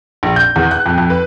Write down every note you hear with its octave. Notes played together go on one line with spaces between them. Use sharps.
A#1
G6
E2
F#6
F2
F2
B4